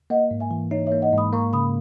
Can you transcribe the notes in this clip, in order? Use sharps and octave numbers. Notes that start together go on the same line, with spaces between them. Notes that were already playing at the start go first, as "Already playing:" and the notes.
A#3 D#5 F#5
G#2
E5 G#5
E3
D#4 C#5 E5
C#5 E5
A#3
D#5 F#5
G#2
B5 D#6
A#3 A#5 C#6
C#3 B5 D#6